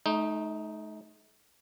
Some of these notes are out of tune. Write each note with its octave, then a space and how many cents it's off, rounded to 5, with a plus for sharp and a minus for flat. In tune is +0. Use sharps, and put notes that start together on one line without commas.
A3 -45 D#4 +0